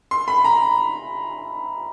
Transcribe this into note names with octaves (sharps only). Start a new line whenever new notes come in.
C6
B5
A#5